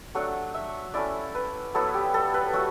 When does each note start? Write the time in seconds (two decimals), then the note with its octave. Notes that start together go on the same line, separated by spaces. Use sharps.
0.15 F#3 A3 D4 F#5
0.54 E5
0.94 A3 C#4 E4 D5
1.35 B4
1.74 F#3 B3 E4 A4
1.94 G4
2.14 A4
2.34 B4
2.53 F#3 A3 F#4